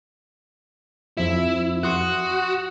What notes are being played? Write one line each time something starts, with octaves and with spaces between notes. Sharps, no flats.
F2 F3 E4 E5
F#4 C6 D#6 F#6